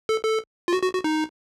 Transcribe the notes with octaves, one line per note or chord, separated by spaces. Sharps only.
A4
A4
F4
F#4
F#4
F#4
D#4